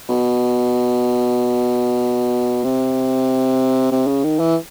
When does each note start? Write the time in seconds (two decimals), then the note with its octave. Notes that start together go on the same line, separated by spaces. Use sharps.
0.09 B2
2.64 C3
3.92 C3
4.07 C#3
4.24 D#3
4.39 E3